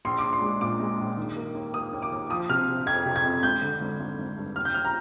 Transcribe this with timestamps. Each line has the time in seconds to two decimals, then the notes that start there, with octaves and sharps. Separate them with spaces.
0.05 A#1 C6
0.18 D6
0.24 D4
0.33 C6
0.42 G#3
0.61 A#2 D6
0.80 G#3
0.99 A#1
1.17 D#3
1.36 A#3
1.55 D#2
1.74 A#3 D#6
1.93 D#2
2.02 D6
2.12 D#2
2.30 F3 D#6
2.49 C3 F6
2.68 C3
2.86 F2 G#6
3.06 C3
3.16 G#6
3.24 F2
3.43 G#1 G6
3.62 D3
3.81 G#1
4.00 G#1
4.18 G#1
4.38 G2
4.56 D#2 F6
4.65 G6
4.74 D#2 F6
4.85 A#5